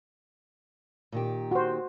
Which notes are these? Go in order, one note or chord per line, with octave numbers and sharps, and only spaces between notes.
A#2 D#3 G4
F#4 C5